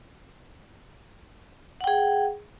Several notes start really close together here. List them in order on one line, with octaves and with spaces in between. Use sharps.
F#5 G5 G#4